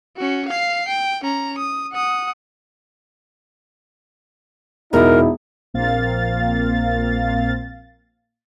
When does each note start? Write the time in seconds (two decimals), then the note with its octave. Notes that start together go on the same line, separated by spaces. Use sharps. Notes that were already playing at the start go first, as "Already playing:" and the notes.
0.17 C#4 F#4
0.48 F5 C7
0.88 G5
1.24 C#4 A#5
1.58 D#6
1.92 F#5 D#6
4.93 E1 D#4 E4 A#4
5.74 A#1 A#2 A#3 C4 F5 A6